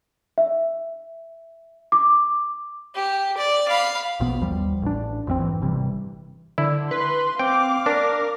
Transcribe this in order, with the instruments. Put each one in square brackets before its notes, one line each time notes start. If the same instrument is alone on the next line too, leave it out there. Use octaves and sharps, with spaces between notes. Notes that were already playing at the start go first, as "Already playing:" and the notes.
[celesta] E5
D6
[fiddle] G4
D5
F5 B5
[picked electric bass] A#1 B2 B3
G1 D#2 F3 G3
A1 D4
A#1 F2 E3 C4
G#2 E3
G1 C3 E3 G3
[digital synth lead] D3 [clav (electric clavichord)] E4
[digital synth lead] B4 [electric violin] C6
[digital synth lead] C4 [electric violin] F5 D6 [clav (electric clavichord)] G5
[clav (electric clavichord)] D4 [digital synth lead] A#4